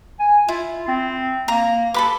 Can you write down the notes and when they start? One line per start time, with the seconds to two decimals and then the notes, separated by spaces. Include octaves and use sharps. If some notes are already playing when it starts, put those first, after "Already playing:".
0.20 G#5
0.48 E4 F4
0.88 C4
1.48 A#3 A#5
1.94 A4 B4 B5 D6